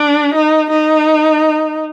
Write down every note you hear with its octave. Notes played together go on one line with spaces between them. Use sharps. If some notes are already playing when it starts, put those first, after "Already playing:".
Already playing: D4
D#4
D#4